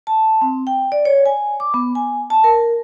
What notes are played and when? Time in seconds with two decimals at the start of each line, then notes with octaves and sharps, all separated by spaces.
0.07 A5
0.42 C4
0.67 G5
0.92 D5
1.05 C#5
1.26 G#5
1.60 D6
1.74 B3
1.95 G#5
2.30 A5
2.44 A#4